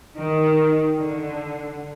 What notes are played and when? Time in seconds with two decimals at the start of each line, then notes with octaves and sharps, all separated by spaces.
0.15 D#3
0.99 D3